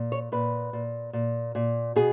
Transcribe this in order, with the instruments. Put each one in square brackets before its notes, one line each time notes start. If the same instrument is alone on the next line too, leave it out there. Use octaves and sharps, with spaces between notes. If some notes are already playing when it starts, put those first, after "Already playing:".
Already playing: [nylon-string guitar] A#2
C#5
A#2 B4
A#2
A#2
A#2
B2 G#4